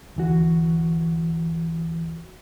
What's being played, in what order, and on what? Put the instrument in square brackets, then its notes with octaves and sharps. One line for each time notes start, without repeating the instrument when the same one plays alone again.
[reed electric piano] D2 E3 F#4